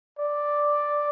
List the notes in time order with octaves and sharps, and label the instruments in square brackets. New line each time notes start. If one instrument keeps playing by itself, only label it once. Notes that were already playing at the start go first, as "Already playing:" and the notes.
[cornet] D5